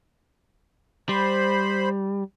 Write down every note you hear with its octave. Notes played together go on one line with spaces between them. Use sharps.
G3 C5 B5